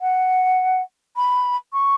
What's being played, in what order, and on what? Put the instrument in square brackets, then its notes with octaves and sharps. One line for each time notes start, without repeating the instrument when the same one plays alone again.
[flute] F#5
B5
C#6